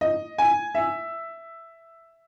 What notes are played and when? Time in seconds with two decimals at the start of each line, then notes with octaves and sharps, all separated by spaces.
0.01 D#5
0.38 G#5
0.75 E5